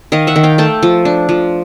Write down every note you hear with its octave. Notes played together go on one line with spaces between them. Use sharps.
D#3 D#5 F5
E5 F#5
D#3
F5 G5
A3 G5 A5
F3
D4
F3